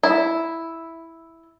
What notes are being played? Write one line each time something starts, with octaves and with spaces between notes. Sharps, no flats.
E4